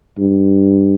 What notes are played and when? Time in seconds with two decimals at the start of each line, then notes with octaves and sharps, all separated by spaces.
0.19 G2